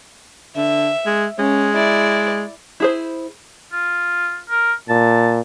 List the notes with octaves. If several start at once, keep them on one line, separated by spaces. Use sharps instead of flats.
D3 E5
G#3
G#3 C#4
E4 D5
E4 G#4 C5
F4
A#4
A#2 A5